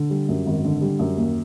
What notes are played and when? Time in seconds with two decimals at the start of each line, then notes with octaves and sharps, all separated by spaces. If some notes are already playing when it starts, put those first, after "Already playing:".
Already playing: D3
0.10 G3
0.29 F#2
0.46 G#1
0.64 D3
0.81 G3
0.99 F#2
1.17 D#2